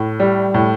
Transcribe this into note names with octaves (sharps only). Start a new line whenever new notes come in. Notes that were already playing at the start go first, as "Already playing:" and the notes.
Already playing: A2
G3
A2